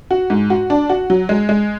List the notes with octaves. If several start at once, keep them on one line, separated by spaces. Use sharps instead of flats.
F#4
G#2
F#4
D4
F#4
F#3
G#3
G#3